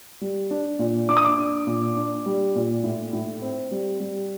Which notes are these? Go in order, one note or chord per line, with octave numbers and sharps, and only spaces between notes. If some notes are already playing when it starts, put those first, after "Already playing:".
G3
D4
A#2
D4 D6
D#6
D6
D4
A#2
D4
G3
A#2
A2
A2
C4
G3
G3